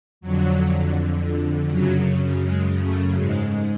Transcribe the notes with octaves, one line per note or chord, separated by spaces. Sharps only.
F2 D3 F#3
F#2 C#3 F#3
G#3
A3
G#2 G#3